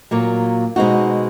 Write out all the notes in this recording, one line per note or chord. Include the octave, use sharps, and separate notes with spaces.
A#2 F#3 A#3
B2 G#3 C4 D#4 F#4